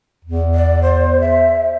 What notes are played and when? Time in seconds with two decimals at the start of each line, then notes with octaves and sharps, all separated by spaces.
0.25 E2
0.55 D5
0.82 C5
1.21 E5